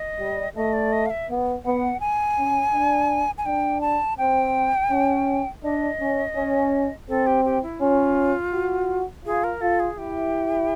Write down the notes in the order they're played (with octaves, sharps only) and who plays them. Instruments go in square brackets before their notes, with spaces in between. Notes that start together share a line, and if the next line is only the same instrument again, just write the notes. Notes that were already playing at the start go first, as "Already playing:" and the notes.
Already playing: [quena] D#5
[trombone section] G3
[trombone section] A3 [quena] D#5
[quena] D5
D#5
F5
E5
[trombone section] B3
[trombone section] B3 [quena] F#5
[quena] G#5
[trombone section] C#4
D4
[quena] G#5
[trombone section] D4 [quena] G5
[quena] A5
[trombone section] C4 [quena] G5
[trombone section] C#4
[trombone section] D4 [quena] D#5
[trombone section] C#4
C#4
[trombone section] C4 [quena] A4
[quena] G4
G4
E4
[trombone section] C#4 [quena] F4
[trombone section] F#4
[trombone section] F4 [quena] G#4
[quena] A#4
[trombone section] F4 [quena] A4
[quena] G#4
[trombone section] E4 [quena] G4